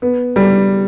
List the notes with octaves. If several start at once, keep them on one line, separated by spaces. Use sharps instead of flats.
B3
G3